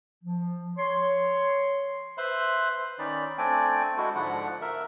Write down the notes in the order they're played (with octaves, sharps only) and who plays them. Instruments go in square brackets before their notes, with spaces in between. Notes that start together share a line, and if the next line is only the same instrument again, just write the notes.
[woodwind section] F3
C#5 C6
[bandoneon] B4 C5 E5 B5 C6
D#3 C#4 D#4 D5 B5
A3 C4 D4 D5 G5 G#5
G#3 E4 F#4 A4
G#2 D3 F3 F#5
A#4 E5